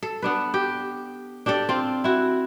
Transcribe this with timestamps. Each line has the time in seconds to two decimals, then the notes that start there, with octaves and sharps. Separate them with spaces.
0.03 A4
0.22 B3 D4 B4
0.54 G4
1.46 D4 G4 A4 D5
1.69 C4 F4
2.04 E4 F#4